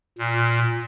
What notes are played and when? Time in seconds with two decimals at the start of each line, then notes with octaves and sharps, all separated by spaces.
0.19 A#2